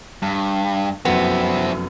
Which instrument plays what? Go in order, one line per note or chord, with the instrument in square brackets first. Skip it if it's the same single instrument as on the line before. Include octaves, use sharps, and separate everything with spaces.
[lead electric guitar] G2
[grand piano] F1 F#2 [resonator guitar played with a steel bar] B3 [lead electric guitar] C4 E4